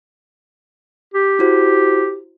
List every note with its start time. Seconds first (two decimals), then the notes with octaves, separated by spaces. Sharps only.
1.14 G4
1.39 E4 F#4 C5